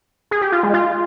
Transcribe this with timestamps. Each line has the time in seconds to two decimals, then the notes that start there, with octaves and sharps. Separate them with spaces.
0.31 G#4
0.41 G4
0.52 F4
0.63 G#3
0.74 F4